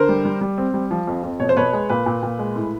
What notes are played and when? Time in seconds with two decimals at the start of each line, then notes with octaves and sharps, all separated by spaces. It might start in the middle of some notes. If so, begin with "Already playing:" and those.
Already playing: D3 A#4 C5
0.09 G3
0.25 G3
0.41 G3
0.58 C4
0.74 G3
0.91 F3
1.07 F2
1.23 F2
1.40 B2 C#5
1.49 C5
1.57 B2 B4 C#5
1.73 G#3
1.89 A#2 B4
2.06 A#2
2.22 A#2
2.39 G#3
2.56 A2